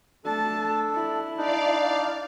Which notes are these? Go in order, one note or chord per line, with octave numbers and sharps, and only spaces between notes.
A3 D4 A4 A5
E4
D4 D#4 D5 F5